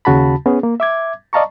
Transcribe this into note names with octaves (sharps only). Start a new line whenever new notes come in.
D#2 C#3 F#4 A5 B5
B3 C#4 G#4
A#3
E5 D6 G#6
D5 D#5 F5 A5 A#5 C#6